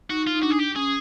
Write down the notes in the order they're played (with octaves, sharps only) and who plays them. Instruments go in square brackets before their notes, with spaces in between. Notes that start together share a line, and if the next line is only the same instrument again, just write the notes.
[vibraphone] D#4 [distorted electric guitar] F#4
[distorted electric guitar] F4
[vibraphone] D#4
[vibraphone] D4 [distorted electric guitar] F#4
[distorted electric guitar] G#4
G4
[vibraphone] C#4 [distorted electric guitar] G#4